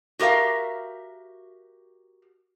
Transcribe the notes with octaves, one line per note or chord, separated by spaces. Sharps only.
F#4 G4 A#4 E5 F5